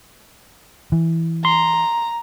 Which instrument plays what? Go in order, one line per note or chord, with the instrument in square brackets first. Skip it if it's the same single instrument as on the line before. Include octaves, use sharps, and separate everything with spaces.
[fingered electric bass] E3
[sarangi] A#5 [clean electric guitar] C6